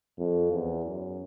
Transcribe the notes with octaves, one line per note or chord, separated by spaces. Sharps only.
F2
E2
F#2